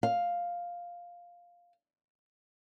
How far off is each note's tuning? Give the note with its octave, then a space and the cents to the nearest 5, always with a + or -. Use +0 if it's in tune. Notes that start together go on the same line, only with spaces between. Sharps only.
F5 +5